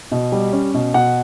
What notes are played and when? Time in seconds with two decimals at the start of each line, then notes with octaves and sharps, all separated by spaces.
0.12 B2
0.32 G3
0.53 C#4
0.74 B2
0.94 B2 F#5